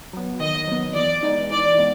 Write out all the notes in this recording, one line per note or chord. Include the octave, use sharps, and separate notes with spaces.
F#3 B3
D#3 D#5
F#3 B3
E3 D5
G#3 B3 D#4
E3 D5
G#3 B3